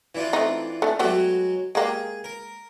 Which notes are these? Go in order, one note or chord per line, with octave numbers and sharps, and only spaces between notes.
E3 D4 F4
A3 C4 D#4
A3 D4
F#3 G#3 A3 B3 F#4 G4
G#3 A#3 G4 G#4
A#4